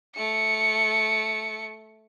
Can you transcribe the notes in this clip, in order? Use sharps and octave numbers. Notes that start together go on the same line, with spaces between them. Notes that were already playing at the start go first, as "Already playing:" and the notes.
A3 C#7